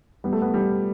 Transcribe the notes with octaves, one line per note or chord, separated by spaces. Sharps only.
G3 B3
A3
B3
G3